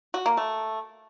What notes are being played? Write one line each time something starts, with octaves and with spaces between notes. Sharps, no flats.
F#4
A#3
A3